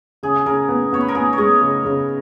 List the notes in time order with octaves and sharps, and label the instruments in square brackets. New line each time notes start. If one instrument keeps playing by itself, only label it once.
[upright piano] C#3 [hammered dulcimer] G#4
[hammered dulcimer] G#4
[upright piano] C#3 [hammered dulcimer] A#4
[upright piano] B3
[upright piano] B3 [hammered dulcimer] C#5
[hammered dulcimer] B4
A#4
[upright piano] B3 [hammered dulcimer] G#4
[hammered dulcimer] C#5
[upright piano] G#3 [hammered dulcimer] D#5
[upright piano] C#3
C#3